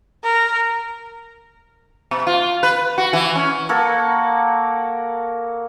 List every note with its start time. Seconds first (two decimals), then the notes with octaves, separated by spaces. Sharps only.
0.24 A#4
2.11 B2
2.27 F4
2.63 B4
2.98 F#4
3.13 E3
3.35 C#4
3.69 A#3 F#4 A4